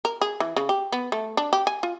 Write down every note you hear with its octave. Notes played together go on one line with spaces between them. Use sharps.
A#4
G#4
E3
C#3
G4
B3
A3
D4
G4
G#5
F4